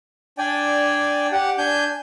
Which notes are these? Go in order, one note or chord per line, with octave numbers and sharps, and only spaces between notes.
D4 D5 G5 G#5
G4 F#5
D4 G#5 G6